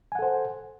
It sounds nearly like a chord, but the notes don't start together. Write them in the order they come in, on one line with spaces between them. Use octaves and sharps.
G#5 F#5 A4 C5